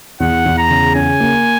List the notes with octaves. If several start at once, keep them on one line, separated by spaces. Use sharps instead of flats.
E2 F#5
E2
A#5
C#3
C#4 G#5
A#3